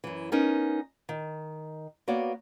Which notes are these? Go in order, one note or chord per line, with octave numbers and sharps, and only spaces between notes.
F#2 E3
B3 C#4 D#4 A#4
D#3
A#3 B3 F#4 C#5 D5